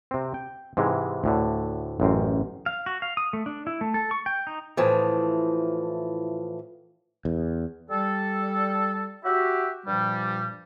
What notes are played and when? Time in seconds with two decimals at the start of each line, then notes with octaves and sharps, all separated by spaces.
0.11 C3 C4
0.34 G5
0.77 G#2 C3 E3 G#3
1.24 D2 A2 D3
2.00 A1 F#2 C4
2.66 F5
2.86 F#4
3.02 F5
3.17 D#6
3.33 A3
3.46 D4
3.67 E4
3.81 A3
3.94 A4
4.11 C#6
4.26 G5
4.47 D#4
4.77 A2 E3 F3
7.25 E2
7.90 G3 A4
9.24 F#4 G4 E5
9.85 G2 A#2 F3 G3